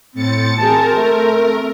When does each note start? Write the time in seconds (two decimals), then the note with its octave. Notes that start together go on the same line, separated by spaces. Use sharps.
0.14 A2 C4 A6 C#7
0.58 C4 G#4 A#4 A5
0.95 A3